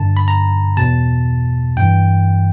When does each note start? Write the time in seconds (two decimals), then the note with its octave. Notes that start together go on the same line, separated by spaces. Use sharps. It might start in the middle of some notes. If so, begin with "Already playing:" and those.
Already playing: G2 D3 A5
0.17 B5
0.28 A#5
0.77 E2 B2 A5
1.77 G2 E3 G5